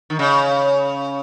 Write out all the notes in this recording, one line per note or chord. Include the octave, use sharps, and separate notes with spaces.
D#3
C#3